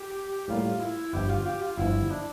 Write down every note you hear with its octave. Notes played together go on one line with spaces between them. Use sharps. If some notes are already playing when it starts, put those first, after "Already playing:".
Already playing: G4
A2 G3 A#3 F4
E4
G1 G2 F3 G4
F4
G4
F4
G1 G2 F3 E4
D4